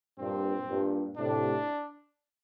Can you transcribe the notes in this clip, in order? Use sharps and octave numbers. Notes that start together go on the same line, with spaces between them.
G2 A#2 C4
G2 A#2
A2 C3 D4